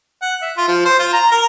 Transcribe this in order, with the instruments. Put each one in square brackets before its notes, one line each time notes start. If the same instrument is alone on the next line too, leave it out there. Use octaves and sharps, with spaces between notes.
[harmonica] F#5
E5
F4
F3
C5
F4
A#5
A#4